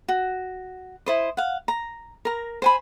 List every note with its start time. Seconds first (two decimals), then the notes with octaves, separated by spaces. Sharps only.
0.08 F#4
1.06 E4 C5 D#5
1.37 F5 F#5
1.68 A#5
2.25 A#4 A#5
2.62 C5 G#5 B5